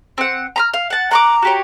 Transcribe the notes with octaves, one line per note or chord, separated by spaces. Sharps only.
C4 F#5
A#5 B5 F6
F5
F#5 A5
F#5 A#5 C#6 D6
F#4 G4 C#5